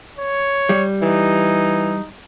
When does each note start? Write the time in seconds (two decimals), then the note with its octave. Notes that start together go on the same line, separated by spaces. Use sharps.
0.19 C#5
0.69 G3
1.02 E3 D#4